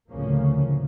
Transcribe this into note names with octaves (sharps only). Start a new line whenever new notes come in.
D2 A2 C#3 F3 A#3 C#4